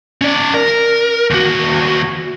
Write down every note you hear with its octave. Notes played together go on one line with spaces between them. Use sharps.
C#4 D5
A#4
D#2 F#4